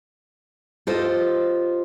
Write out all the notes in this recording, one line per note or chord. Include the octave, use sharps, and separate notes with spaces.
F4 G4 A4 C5 D#5